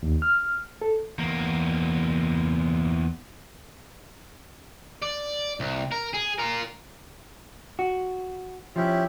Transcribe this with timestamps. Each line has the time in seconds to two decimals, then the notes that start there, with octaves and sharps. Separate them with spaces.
0.03 D#2
0.22 F6
0.82 A4
1.19 E2 A#3
5.02 D5
5.60 C2
5.92 A#4
6.14 G#4
6.39 F4 A#4
7.79 F#4
8.76 F3 C#4 E4 G4